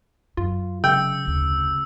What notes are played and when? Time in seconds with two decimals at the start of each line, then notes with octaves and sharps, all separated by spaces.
0.37 F#2 F4
0.84 F1 C#3 F#3 G5 E6
1.25 F1 D2